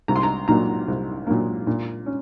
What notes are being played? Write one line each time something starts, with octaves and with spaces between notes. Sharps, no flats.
C2 A#5
C6
A#5
A#2 F#3 A#3 A#5
C2
A#2 F#3 A#3
A#2
C#4